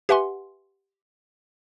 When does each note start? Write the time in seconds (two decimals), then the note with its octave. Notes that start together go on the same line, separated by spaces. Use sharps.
0.09 G4 B4 E5 F#5 G#5 C6